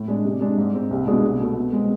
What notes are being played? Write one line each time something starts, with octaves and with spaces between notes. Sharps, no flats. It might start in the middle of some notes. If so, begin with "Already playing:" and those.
Already playing: A2
G#3 D4
C3
G#3 D4
G#2
G#3 C4
C2
B2 G#3 D4 G#4
C2
B2 A3
B2
G#3 C4